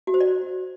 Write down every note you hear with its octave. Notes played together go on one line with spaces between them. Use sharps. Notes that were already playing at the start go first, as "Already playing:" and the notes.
F#4
C5
D5